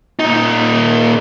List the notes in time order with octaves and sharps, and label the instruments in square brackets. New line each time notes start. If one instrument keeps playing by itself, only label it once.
[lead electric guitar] A#2 D#4